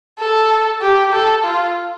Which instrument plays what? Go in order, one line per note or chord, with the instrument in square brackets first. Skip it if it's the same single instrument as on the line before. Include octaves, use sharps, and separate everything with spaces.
[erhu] A4
G4
A4
F4